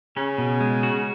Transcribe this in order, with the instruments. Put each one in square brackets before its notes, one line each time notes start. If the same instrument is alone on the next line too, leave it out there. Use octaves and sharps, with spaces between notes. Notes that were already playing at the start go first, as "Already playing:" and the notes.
[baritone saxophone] C#3 [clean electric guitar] C#4
[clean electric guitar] B2
G#3
F#4